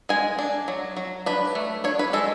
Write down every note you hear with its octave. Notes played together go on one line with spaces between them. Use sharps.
G#3 G#5
D4
F#3
F#3
D4 B4
A3
D4 C#5
B4
G#3 A4